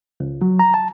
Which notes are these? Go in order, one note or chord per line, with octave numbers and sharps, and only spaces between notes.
C#2
F#3
A#5
A5